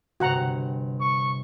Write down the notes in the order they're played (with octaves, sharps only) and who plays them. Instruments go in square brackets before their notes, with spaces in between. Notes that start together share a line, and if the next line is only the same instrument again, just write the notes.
[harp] G1 C3 [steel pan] F#4 F#5 A#5
[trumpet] C#6